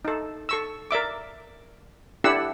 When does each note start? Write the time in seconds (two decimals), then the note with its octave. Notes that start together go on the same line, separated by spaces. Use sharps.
0.05 D#4 A4
0.49 A4 C#6 E6
0.91 A#4 D5 E5 D6
2.24 D4 E4 G4 A4 F#5 E6